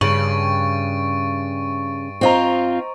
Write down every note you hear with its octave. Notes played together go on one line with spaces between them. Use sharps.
G2 C#3 C#6 A6 D7 F#7
C4 F4 C5 D#5 A#5